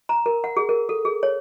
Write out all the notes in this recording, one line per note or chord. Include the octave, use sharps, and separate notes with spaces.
A#5
A#4
F#5
G#4
A#4
A4
G#4
C#5